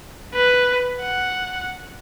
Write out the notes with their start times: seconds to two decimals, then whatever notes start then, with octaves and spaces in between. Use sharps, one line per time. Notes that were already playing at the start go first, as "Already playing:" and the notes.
0.34 B4
1.00 F#5